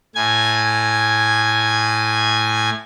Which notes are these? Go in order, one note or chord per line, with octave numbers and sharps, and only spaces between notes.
A2 G#5 G#6